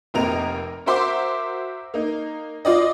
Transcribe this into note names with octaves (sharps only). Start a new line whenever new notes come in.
F1 C3 A#3 A#4 D#5 F7
F#4 A#4 C5 E5 C6 D6
A#3 D#4
F4 D5 D#5